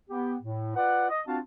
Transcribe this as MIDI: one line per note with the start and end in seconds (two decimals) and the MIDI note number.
0.10 0.36 59
0.10 0.36 67
0.42 0.76 45
0.76 1.09 65
0.76 1.09 71
0.76 1.09 74
0.76 1.09 78
1.09 1.22 75
1.27 1.38 60
1.27 1.38 62
1.27 1.38 65
1.27 1.38 66
1.27 1.38 77
1.27 1.38 81